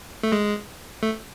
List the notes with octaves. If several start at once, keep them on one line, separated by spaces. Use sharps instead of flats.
A3
G#3
A3